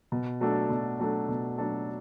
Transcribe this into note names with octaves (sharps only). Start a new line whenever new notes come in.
B2
F#3 A3 D4 A4
B2
F#3 A3 D4 A4
B2
F#3 A3 D4 A4